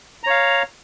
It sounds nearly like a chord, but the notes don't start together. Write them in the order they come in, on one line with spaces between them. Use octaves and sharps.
A#5 C#5 F5